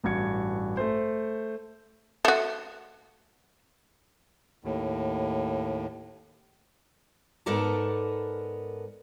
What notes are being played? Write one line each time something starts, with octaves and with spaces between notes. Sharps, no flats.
A1 G2 F#4 G#6 C#7
A3 C5
A3 F#4
D#2 A2
G#2 B3 A4 A#4 D5 A5